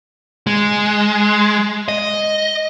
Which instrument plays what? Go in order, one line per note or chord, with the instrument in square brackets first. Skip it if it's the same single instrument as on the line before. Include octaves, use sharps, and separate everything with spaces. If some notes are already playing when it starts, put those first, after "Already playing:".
[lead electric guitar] G#3
D#5